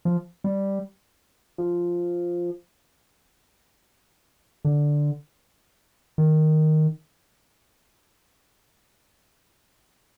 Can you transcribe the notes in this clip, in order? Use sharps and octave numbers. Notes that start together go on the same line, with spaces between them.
F3
G3
F3
D3
D#3